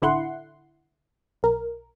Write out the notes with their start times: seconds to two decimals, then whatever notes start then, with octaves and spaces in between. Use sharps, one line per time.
0.02 A1 D3 E4 F#5 C6
1.43 B1 A#4